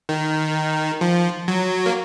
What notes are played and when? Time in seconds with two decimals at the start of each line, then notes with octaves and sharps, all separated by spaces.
0.09 D#3
1.01 F3
1.48 F#3
1.86 A#3